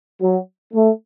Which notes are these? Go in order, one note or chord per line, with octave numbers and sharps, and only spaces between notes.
F#3
A3